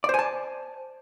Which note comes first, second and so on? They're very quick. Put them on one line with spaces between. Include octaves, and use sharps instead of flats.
D5 C5 G#5 A5